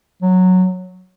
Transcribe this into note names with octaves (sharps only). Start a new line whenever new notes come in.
F#3